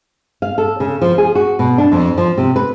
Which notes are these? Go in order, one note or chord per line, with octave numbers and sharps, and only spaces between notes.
F5
A4
C#3
F3
G#4
F#4
B2
D4
F2
F3
C3
B4